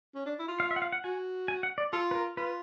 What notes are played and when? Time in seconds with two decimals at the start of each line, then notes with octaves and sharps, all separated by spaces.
0.15 C#4
0.26 D4
0.39 E4
0.48 F4
0.60 F5
0.71 E5
0.76 F#5
0.82 F5
0.92 F#5
1.04 F#4 G#5
1.48 G#5
1.63 F#5
1.78 D5
1.93 F4 A4
2.11 B4
2.15 A#4
2.37 F4 B4